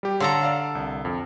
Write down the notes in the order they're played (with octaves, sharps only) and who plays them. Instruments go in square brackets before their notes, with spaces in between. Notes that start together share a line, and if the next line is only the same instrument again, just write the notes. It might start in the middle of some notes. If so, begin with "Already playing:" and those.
[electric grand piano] G3 G4
[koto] D3 A4 A#5 [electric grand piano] C#5 F5 C6
[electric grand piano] D5 F5
C2
F2